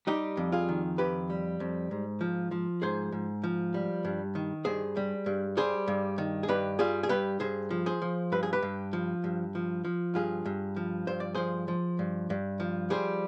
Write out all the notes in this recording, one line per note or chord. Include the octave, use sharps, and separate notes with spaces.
G3 D#4 G4
F2
F4 G#4
D#3
F2 G4 B4
G3
F2
G#2
F3
F3
G#2 G#4 C5
G#2
F3
G3
G2
D#3
G2 G#4 C5
G3
G2
G3 G#4 C5
G2
D#3
G#4
G2 G4 B4
G3 F4 G#4
G#4
G2 G4 B4
G2 G#4 C5
F3
G#4 C5
F3
G2 B4
G#4
G4 B4
G2
F3
G2
F3
F3
G2 F4 G#4
G2
F3
G2 C5
D5
F3 G#4 C5
F3
G2
G2
F3
G3 G#4 C5